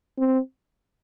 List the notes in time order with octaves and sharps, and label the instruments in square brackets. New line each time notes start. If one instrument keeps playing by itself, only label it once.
[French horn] C4